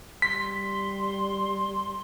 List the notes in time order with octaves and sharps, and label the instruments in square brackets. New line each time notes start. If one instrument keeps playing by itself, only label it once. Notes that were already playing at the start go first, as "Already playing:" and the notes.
[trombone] G3 [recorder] C6 [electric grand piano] B6